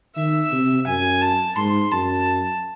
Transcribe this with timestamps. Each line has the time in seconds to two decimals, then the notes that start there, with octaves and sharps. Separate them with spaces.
0.16 D#3 E5
0.52 C3
0.87 F#2 G#5
1.21 A5
1.57 G#2 C6
1.92 F#2 A5